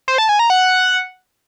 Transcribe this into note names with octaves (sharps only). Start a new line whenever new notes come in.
C5
A5
G#5
A#5
F#5